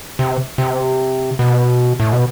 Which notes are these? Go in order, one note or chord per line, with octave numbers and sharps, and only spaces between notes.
C3
C3
B2
A2
B2